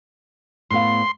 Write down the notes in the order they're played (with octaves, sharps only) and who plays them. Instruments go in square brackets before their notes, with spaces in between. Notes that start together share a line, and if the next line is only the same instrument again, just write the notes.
[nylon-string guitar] A2 B3 F5 [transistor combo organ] C6